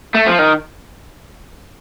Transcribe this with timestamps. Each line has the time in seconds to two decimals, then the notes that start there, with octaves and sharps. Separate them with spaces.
0.15 A3
0.27 F3
0.39 D#3